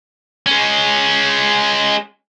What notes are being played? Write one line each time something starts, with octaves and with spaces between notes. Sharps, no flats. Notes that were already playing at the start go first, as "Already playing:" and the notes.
G#3 C#4